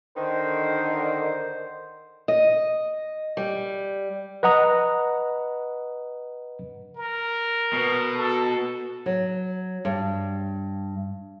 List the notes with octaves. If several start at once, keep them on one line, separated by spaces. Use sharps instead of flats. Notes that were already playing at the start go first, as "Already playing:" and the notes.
D3 D#3 C5
D#5
G3
B4 D#5 F#5 A#5 D#6
A#4
B2
A4
F#3
G2